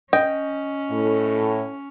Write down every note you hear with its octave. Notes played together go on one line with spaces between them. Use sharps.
C#4 D#5 G5
A2